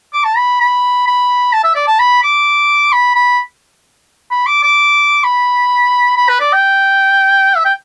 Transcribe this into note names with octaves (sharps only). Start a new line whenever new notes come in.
D6
A5
B5
B5
B5
A5
E5
D5
A5
B5
D6
B5
B5
B5
D6
D6
B5
B5
B4
D5
G5
E5
G5